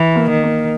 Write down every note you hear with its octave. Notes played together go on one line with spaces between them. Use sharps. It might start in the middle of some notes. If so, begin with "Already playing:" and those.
Already playing: E3
A#3
D#3
A#3